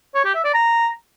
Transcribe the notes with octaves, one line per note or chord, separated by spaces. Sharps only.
C#5
G4
E5
D5
A#5